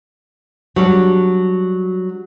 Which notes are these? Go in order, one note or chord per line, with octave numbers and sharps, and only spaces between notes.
F#3 G3 D4